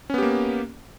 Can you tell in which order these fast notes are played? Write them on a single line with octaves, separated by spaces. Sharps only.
C#4 B3 G4 A#3